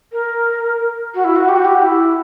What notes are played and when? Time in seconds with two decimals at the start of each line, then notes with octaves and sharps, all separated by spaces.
0.12 A#4
1.15 F#4
1.24 E4
1.36 F#4
1.48 G4
1.56 F#4
1.65 G4
1.82 E4